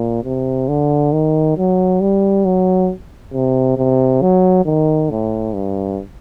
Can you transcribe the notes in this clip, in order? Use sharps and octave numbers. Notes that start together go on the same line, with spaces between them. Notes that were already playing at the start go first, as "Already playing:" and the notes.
Already playing: A#2
C3
D3
D#3
F#3
G3
F#3
C3
C3
F#3
D#3
A2
G2